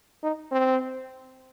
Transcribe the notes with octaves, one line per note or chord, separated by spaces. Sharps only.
D#4
C4